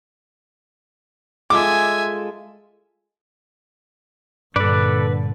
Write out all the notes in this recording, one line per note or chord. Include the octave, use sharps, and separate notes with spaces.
G#3 F4 A4 E5 G#5 D6
G2 A#2 D3 A4 B4 D5